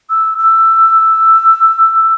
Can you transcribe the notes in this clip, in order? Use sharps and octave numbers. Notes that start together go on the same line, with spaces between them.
E6
E6